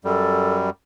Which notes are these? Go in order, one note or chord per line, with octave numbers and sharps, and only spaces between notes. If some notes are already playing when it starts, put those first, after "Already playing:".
F#2 G3 A4